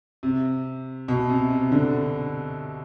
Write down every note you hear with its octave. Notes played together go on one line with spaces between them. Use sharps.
C3
B2
C3
C3
D3